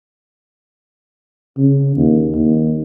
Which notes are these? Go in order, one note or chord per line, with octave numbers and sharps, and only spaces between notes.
C#3
D#2
D#2